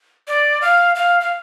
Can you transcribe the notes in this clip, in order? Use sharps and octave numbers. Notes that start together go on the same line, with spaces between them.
D5
F5
F5
F5